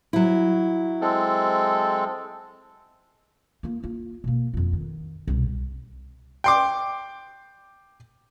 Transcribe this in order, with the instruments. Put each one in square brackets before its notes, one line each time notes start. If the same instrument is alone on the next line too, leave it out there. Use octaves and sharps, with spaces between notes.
[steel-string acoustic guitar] F#3 E4
[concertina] G#3 C4 A4
[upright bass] A#3 F4
A#3 F4
B2 A#3
F2 F4
D#3
C2 B2
[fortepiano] G5 C6 D6